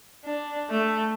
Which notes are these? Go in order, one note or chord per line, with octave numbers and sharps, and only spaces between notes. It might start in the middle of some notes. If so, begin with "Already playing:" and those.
D4
A3